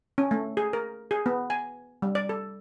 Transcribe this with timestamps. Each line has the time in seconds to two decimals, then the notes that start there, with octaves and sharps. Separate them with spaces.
0.18 C#4
0.31 A3
0.57 G#4
0.73 A#4
1.11 G#4
1.26 B3
1.50 G#5
2.02 G3
2.15 D5
2.29 A4